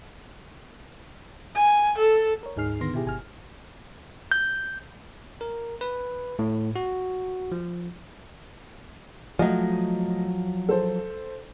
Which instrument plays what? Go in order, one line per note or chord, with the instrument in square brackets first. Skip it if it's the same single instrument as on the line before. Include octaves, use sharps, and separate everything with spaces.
[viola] G#5
A4
[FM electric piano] A#4 C#5
D2 G#2 D#4 G#4 F6 C7
D3 D#3 B3 C6 A#6
B2 E4 G4 G#4
G1 G#5 F6
[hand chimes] G6
[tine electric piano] A#4
B4
A2
F#4
F3
[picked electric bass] F3 F#3 [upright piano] A3 D#5
[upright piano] A4 C5